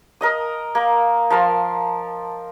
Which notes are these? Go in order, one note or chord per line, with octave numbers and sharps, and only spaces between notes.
A#4 D#5 D#6
A#3
F3 A#4 A5 C6